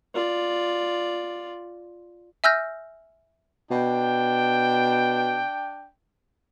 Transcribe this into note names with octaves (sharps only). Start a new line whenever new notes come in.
F4 D5
E5 G#5 E6 F6 G6 A#6
B2 D4 G5